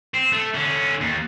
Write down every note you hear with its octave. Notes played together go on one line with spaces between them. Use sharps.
C4
A3
D3 C#4
D#2